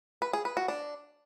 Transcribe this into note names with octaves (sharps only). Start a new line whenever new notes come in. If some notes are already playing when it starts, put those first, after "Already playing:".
B4
G#4
B4
F#4
D4